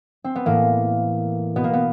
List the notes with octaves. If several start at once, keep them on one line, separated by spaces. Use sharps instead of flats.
C4
B3
A2 E3 A#3
B2 B3
A#3
B3